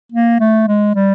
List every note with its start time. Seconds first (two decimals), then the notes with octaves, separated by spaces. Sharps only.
0.12 A#3
0.40 A3
0.68 G#3
0.95 G3